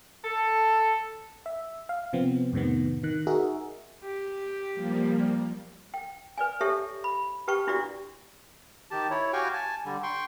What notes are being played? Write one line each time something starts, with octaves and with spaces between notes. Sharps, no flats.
A4
E5
F5
C3 F3 B3 C4
F2 A2 C3 D#3 B3
D#3 F#6
D#4 F#4 G#4 A#4 E5
G4
F3 G3 A#3
G5
B4 D5 G#5
G4 A4 C#5 E5 A5
B5
G4 B4 G5 A5 C#6
D4 E4 F#4 G4 D5
D#3 G4 A5
E4 C#5
F#4 G4 F5 G5 G#5 C#6
G#5 A5
D3 G3
G5 C6 C#6